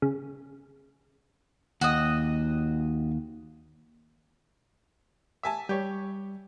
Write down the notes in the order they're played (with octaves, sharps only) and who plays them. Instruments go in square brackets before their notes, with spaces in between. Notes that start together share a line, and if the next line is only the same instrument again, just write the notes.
[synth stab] C#3
[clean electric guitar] D#2 [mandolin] F#4 D#5
[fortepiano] E5 G#5 A5
[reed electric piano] G3 [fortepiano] G4 C#5